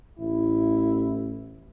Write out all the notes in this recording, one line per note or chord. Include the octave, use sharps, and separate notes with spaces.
A1 E4